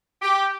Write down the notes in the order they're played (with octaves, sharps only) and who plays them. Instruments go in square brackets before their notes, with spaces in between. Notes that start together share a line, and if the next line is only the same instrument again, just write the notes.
[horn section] G4